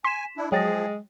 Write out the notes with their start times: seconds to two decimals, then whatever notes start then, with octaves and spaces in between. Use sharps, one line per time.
0.04 G#5 C6 B6 E7
0.37 D4 E4
0.52 F3 F#3 G#3 G#4 G5 A6 A#6